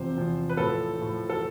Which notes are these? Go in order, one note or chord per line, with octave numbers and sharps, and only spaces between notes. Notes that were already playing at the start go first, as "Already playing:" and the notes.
Already playing: E2 C3 F3 C5
E2 C3 F3
B4
A2 F3 A4
A2 F3
A4